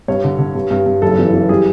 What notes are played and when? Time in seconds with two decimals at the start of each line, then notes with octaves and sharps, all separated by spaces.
0.08 G2 C#5
0.24 D3
0.39 D3
0.55 G2
0.71 G2
0.86 G2
1.02 F#1 A4
1.19 E3
1.33 E3
1.49 G3 G#4